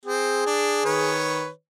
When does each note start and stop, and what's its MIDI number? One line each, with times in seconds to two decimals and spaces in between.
0.06 0.42 60
0.06 1.17 68
0.47 0.82 62
0.85 1.49 51
0.85 1.49 71
0.85 1.49 73